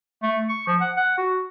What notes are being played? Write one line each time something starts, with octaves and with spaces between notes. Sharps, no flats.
A3
C#6
F3
F#5
F#5
F#4